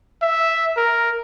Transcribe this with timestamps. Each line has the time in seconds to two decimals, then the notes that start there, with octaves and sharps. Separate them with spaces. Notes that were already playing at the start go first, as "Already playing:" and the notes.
0.23 E5
0.77 A#4